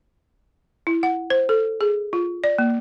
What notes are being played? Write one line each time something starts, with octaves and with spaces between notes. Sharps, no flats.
E4
F#5
C5
A4
G#4
F4
D5
A#3